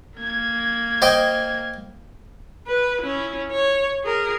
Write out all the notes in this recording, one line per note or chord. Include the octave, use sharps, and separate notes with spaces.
A#3 G#6
C5 D#5 G5
B4
C#4 E4
C#5
G#4 A#4